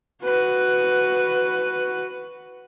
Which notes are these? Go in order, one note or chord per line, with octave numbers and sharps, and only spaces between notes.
F#4 B4